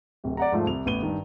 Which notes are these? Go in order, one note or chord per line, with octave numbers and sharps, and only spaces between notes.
D1 C3
D5 F#5 A#5
G#2 F3 A3
C2 F7
A1 B3 D#7 G7
G2 D#3